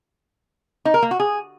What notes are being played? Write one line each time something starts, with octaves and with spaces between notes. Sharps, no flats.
D#4
A#4
A#3
F#4
G#4